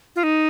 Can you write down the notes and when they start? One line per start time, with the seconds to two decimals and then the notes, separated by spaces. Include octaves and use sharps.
0.16 F4
0.23 D#4